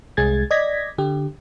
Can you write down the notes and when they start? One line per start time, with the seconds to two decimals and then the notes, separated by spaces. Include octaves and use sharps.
0.17 C2 G#3 G#4 G#6 A6
0.51 D5 D#5 G#6 A#6 B6
0.98 D3 G4